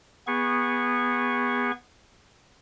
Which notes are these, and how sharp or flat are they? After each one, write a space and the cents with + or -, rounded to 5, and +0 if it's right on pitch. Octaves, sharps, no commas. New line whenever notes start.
B3 -10 G#4 -25 C#6 +0